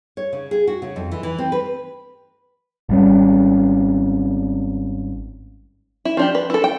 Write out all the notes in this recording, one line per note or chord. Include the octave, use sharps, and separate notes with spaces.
C#5
C#3
G#4
F#4
C#3
F2
E3
E3
C4
B4
G#1 G3 C#4
E4
F3 D4 G4
B4
E4 A4
G5